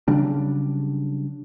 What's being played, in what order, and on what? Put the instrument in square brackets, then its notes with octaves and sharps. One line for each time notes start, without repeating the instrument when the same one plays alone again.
[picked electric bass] C#3 F#3 G3 D4